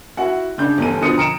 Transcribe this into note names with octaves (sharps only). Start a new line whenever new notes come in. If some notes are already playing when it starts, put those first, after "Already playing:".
E4 F#4 F#5
C#3 D4 G6
G1 E2 A4 D#7
B2 D3 F3 D#6 C#7 D#7
A#5 C#7 D7 E7